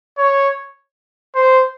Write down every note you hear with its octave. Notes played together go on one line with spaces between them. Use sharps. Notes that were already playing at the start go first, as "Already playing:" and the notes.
C#5
C5